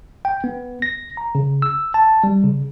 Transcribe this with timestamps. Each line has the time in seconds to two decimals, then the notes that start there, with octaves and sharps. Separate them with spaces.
0.25 G5
0.44 B3
0.82 A#6
1.17 A#5
1.35 C#3
1.62 E6
1.94 A5
2.24 G3
2.44 C#3